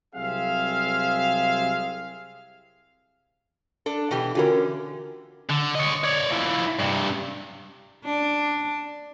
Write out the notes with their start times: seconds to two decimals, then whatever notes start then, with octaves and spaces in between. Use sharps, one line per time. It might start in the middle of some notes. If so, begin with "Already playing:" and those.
0.15 C2 F#3 C4 G#4 E5 F5
3.86 D4 A4
4.11 B2 E3 G4
4.35 D3 E3 C#4 F4 F#4 A#4
5.50 D3
5.75 C#5 D#5
6.04 C#5 D5
6.31 F3 E4
6.79 G2 C3
8.05 D4